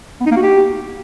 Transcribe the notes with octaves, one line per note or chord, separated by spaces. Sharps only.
B3
D#4
A#3
F#4
G4